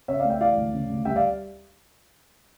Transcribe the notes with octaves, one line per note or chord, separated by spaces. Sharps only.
C#3 C#5 E5
D5 F5
A3
E5 G5
E3 D5 F5
D2
C#3
D2
G3 E5 G5
D5 F5